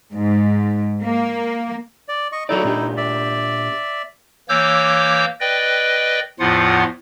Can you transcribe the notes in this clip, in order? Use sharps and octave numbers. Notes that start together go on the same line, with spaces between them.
G#2
A#3
D5
D#5 C#6
F#3 D#4 E4 A4 D5
A#2 D4 G4
D5 E5
E3 A#3 C#5 D6 E6 G6
B4 D5 D#5 G5
E2 A2 F3 F4 F#5